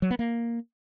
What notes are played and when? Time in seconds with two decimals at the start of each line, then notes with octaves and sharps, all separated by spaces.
0.02 F#3
0.11 B3
0.19 A#3